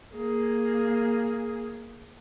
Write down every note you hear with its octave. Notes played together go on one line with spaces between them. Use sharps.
A#3 G#4